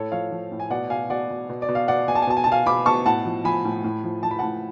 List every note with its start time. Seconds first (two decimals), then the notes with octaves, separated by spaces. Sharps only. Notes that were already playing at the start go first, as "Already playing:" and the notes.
Already playing: A2 A4 C#5
0.12 F3 C#5 F5
0.31 F3
0.52 A2
0.60 G#5
0.70 B2 D5 F#5
0.90 B2 F5 G#5
1.10 B2 D5 F#5
1.30 B2
1.49 B2
1.62 D5
1.68 B2
1.75 F5
1.88 B2 D5 F#5
2.08 B2 G#5
2.15 A5
2.22 G#5
2.27 B2 A5
2.37 G#5
2.44 A5
2.47 B2 F5 G#5
2.66 B2 B5 D6
2.86 B2 A5 C#6
3.06 A2 F#5 A5
3.25 F3
3.44 F3 G#5 B5
3.65 A2
3.84 A2
4.04 F3
4.23 F3 A5
4.31 B5
4.39 A2 F#5 A5